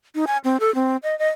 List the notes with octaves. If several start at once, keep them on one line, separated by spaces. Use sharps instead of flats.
D#4
G#5
C4
A4
C4
D#5
D#5